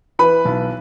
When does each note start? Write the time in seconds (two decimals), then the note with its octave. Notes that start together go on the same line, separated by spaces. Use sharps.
0.19 E3 B4 B5
0.45 B1